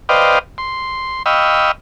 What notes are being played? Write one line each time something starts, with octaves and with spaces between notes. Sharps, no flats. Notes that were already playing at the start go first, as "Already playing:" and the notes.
B4 C5 D5 D#5 F5 G5
C6
D#5 F5 G5 B5 C#6 E6